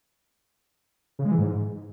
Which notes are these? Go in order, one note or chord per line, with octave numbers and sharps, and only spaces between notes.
C#3
G#3
E3
G#2